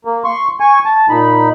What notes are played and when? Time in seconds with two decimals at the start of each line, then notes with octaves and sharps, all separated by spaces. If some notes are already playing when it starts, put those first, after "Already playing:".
0.05 A#3
0.24 C6 C#6
0.60 G#5 C#6
0.85 A5
1.09 A#2 D#4 B5